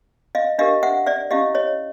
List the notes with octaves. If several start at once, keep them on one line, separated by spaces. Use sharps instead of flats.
D#5 F5
D4 G4 A#4 D#5 F5
E5 F#5
D5 E5
C#4 E4 G4 D#5 F5
C#5 D#5